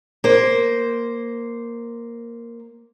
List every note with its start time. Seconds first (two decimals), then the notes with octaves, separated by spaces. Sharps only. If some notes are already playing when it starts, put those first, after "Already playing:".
0.24 A#3 C5